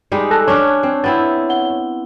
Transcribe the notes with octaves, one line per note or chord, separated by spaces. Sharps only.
G3 G#3 D#4
A4 A5 F#6 A#6
C#4 D4 C#5
C4
B3 C4 E4 A6
F#5 G7